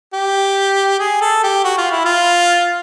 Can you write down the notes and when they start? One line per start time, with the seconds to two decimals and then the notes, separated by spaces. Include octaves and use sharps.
0.14 G4
1.00 G#4
1.21 A4
1.44 G4
1.64 F#4
1.78 F4
1.92 E4
2.05 F4